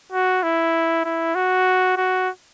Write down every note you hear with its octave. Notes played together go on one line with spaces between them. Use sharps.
F#4
E4
E4
F#4
F#4